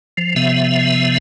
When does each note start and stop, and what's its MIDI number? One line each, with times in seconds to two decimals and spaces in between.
0.17 0.36 53
0.36 1.18 48
0.36 1.18 53
0.36 1.18 59
0.36 1.18 76